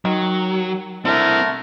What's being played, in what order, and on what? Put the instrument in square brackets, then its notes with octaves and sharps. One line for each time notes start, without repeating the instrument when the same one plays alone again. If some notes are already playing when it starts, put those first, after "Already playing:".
[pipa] D#3 [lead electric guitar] F#3
[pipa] D3 A3 [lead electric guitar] C4 E4 [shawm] A#4